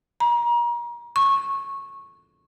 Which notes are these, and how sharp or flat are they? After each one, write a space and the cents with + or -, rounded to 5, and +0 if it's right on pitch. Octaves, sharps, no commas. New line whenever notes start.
A#5 +35
C#6 -15